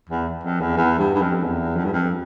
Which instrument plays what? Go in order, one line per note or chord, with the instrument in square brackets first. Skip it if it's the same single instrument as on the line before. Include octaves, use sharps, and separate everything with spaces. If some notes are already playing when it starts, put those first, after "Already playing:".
[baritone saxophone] E2
F2
E2
E2
G2
G2
F2
E2
F2
G2
F2